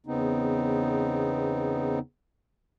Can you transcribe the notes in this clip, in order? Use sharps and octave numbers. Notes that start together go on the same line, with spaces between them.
E2 C#3 B3 C4 D#4